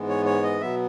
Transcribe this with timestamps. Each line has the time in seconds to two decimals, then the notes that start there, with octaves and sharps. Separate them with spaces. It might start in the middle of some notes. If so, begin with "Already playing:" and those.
Already playing: G#2 E3 G#3 B3
0.09 C#5
0.26 C#5
0.43 D#5
0.61 B2 F#3 B3 E5